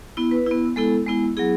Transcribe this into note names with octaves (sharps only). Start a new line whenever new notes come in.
B3 E4
B4
B3 E4
G#3 B3 E4 A4
G#3 B3 E4
F#3 B3 E4 G#4